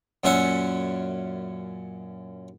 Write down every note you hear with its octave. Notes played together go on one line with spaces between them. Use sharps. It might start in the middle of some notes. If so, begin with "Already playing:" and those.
F#2 A#2 C#4 E5 F#5